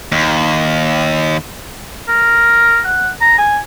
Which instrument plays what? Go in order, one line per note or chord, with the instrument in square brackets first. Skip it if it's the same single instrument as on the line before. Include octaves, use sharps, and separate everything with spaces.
[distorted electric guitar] D#2
[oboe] A#4
F#5
A#5
G#5